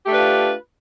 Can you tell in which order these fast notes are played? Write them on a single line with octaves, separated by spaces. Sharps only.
G4 A3 D4 B4 F4